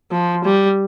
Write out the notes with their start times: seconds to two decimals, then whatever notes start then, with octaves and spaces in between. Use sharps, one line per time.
0.11 F3
0.44 G3